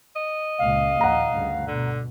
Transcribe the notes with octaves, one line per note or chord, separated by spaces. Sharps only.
D#5
C#2 A#2 F5
A#1 D#2 F#5 A#5
D2 G2 C#3
B2 D3